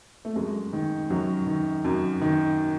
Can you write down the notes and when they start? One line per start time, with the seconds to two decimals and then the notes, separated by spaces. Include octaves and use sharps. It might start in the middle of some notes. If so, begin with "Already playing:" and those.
0.25 A3
0.36 F#2 G#3
0.73 D#3
1.10 F#2 F#3
1.46 D#3
1.84 F#2
2.21 D#3